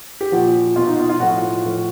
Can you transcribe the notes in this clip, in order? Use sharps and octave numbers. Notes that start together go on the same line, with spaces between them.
G4
A#2 F3 F#4
B2 F4
D#4
F4
F4
A2 F3 F#4
A2 F3